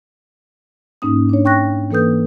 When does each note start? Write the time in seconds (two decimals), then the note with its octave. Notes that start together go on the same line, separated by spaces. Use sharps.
1.02 G#2 A#3 C#4 D#4 D#6
1.29 D4 C#5
1.45 G5 C#6 F#6 A#6
1.91 E3 A#3 A4 B4 D#6 G6